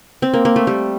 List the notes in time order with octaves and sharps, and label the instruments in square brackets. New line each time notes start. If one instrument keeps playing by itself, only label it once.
[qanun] C4
A#3
A#3
A3
G3